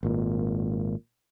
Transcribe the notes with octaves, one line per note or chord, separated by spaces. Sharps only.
G#1 A#2